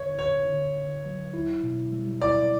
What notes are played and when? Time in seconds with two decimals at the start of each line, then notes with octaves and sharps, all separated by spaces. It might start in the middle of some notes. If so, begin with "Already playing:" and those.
Already playing: F#2 D3 C#5
0.18 D3 C#5
0.46 D3
0.77 D3
1.06 F#3
1.34 E4
1.63 B2
1.92 G3
2.20 E4 D5